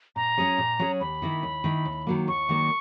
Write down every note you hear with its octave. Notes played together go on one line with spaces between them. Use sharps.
A#2 A#5
F#3 C#4 G#4 C#5
A#2
F#3 C#4 G#4 C#5
D#2 B5
D#3 A#3 E4
D#2
D#3 A#3 E4
D#2
D#3 F#3 A#3
D#2 C#6
D#3 F#3 A#3